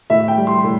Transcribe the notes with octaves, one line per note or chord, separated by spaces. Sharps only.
A2 E5
G5
G3
C6
A2